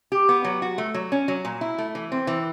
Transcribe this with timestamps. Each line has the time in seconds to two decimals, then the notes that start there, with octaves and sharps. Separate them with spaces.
0.12 G4
0.29 B3
0.44 F#3
0.62 F#4
0.78 A3
0.94 F#3
1.12 C#4
1.28 F#3
1.45 A#2
1.61 E4
1.78 A3
1.95 E3
2.12 C4
2.27 E3